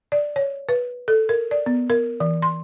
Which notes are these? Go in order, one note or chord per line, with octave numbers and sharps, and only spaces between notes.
D5
C#5
B4
A4
A#4
D5
B3
A#4
E3
C6